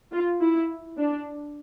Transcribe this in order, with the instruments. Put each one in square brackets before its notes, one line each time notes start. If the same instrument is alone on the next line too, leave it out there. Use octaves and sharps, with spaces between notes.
[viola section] F4
E4
D4